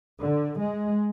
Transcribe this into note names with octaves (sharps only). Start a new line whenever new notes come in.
D3
G#3